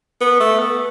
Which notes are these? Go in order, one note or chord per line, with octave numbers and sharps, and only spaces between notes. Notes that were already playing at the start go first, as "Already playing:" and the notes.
B3
A3
B3